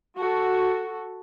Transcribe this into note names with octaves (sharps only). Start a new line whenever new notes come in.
F#4 A4